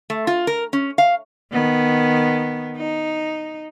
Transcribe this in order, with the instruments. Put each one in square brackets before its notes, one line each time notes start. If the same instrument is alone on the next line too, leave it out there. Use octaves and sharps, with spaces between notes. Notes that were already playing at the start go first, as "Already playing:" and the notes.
[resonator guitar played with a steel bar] A3
F4
A#4
C#4
F5
[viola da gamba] D#3 B3
D#4